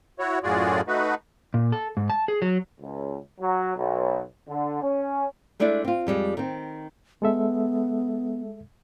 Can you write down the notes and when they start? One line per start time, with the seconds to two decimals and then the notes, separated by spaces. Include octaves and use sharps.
0.19 E4 F#4 C#5
0.43 F#2 A2 F4 F#4 G#4 D5
0.88 A3 D#4 F#4 B4
1.54 A#2
1.72 A4
1.97 G#2
2.10 A5
2.28 G#4
2.42 F#3
2.81 C#2
3.40 F#3
3.76 B1
4.48 D3
4.82 C#4
5.60 G#3 A3 D4 E4 D5
5.85 C4 F4
6.07 F2 G3 G#3
6.37 D#3 C4
7.22 G#3 B3 A4 E5